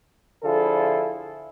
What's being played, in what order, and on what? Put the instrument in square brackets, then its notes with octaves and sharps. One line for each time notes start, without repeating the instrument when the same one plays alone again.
[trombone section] D3 F3 E4 F4 G#4 A4